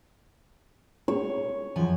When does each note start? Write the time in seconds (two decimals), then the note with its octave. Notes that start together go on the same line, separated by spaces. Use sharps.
1.08 C#5
1.76 F#2 F3 G#5